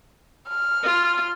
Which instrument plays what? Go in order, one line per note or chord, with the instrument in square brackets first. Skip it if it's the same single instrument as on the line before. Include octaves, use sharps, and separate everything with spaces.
[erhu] F6
[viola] F4